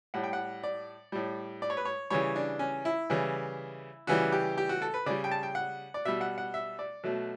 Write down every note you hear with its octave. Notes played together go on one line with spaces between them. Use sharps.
A2 G3 F#5
G5
F#5
D5
A2 G3
D5
C#5
B4
C#5
C#3 E3 G3 C#5
D4
C#4
E4
C#3 E3 G3
C#3 E3 G3 F#4
G4
G4
F#4
A4
B4
C#3 G3 D5
G5
A5
G5
F#5
D5
B2 G3 E5
F#5
F#5
E5
D5
B2 F#3 A3